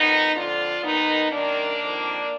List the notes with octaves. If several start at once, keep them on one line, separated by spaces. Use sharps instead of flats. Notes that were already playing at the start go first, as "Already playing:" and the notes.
Already playing: F2 D#3 B3 D#4
F2 D3 D4 F4
D#2 D#3 B3 D#4
F#2 D#3 A#3 D4
F2 D#3